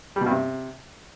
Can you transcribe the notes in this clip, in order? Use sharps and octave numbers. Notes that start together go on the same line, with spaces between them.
G3
B2
G2
C3